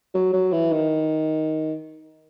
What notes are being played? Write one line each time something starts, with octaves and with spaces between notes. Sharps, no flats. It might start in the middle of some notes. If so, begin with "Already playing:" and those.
F#3
F#3
E3
D#3